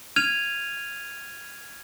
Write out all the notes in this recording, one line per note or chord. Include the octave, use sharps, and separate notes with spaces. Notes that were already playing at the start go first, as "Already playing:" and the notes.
F6 G#6 D#7 F7